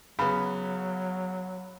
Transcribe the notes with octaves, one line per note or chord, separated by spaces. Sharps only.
C#3 F#3 B3 B5